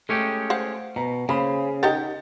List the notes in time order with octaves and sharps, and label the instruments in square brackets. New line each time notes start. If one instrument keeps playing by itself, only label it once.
[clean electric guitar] G#3 C#4 G4 [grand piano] A3
[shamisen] C5 F5 F#5
[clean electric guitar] B2 [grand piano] A#5
[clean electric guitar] C#3 [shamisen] A#3 [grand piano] G#4 C5 B5
[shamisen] D#4 G4 A#4 [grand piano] F#5 G6 A6